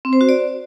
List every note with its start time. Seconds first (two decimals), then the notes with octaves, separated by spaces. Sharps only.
0.05 C4
0.13 C5
0.21 F#4
0.29 D5